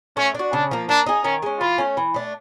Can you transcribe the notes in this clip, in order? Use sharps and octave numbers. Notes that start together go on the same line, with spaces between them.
A3 C#4
D4 F#4
C#3 D4
F3 A#3
A#3 D4
D#4 G#4
D#3 C#4
G#3 C#4
E3 F4
A3 C#4
E3
A3 D4